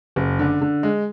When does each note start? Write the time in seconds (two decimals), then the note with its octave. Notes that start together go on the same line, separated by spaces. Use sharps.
0.16 F#1
0.39 D3
0.61 D3
0.83 G#3